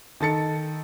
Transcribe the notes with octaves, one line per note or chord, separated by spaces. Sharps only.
D#3 A4 A6 C#7